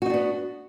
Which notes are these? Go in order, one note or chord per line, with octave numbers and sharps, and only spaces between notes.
B3 D4 D#4 F#4